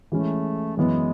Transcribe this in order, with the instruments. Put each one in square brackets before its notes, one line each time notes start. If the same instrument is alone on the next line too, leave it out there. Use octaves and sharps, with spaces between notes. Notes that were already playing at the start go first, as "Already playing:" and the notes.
[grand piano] E3 G#3 C#4 [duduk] A3
[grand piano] F#2 E3 B3 [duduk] G#3